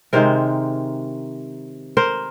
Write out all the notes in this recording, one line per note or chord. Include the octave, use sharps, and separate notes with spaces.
C3 D#3 G#3 A#4 C5
A#4 C5